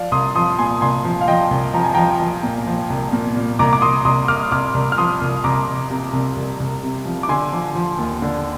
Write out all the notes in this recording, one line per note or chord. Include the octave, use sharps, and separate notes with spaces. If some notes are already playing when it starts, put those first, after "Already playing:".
Already playing: F3 D5 F5
C2 C6 D#6
F3 C6 D#6
A#2 G#5 C6
C2 G#5 C6
F3
F5
F3 D#5 G5
C2
F3 A#5
G#5
F3 G5 A#5
F3
A#2
F3
C2
A#2
A#2
C2 A#5 D6
D6
C2 C6 D#6
C2 C6 D#6
C2 D6 F6
C2 D6 F6
C2
F6
F3 C6 D#6
C2
C2 A#5 D6
C2
C3
C2
C2
C2
C3
F3
D6
D3 G#5 C6
F3
F3
D#2
D3